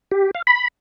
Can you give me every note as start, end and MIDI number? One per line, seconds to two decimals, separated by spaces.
0.11 0.31 67
0.35 0.42 77
0.47 0.68 83